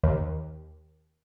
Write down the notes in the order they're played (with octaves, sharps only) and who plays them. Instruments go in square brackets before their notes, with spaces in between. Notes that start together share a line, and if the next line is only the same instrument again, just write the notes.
[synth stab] D#2